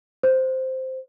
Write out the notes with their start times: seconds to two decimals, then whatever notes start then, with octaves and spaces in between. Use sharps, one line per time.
0.23 C5